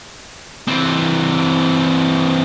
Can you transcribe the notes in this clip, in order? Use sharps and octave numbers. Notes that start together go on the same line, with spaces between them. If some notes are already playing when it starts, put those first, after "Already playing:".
E3 C4